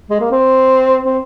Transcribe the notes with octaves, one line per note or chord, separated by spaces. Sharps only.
G#3
A#3
C4
C4